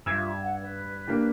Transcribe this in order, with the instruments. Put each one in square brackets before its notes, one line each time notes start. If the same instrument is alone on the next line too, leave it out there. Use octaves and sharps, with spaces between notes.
[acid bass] G2 [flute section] F4 E5 [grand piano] E6 G#6
[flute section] F#5
B4
[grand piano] A#3 D4 G4